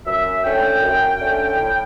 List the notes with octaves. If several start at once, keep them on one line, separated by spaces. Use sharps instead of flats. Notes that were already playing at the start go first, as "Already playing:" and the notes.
F#2 E5
D3 A3 C#4 G5
F#2
D3 A3 C#4
A2